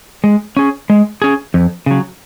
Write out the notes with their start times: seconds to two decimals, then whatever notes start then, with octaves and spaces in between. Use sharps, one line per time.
0.24 G#3
0.57 C#4 G#4
0.90 G#3
1.22 C#4 G#4
1.54 F2
1.86 C#3 F#3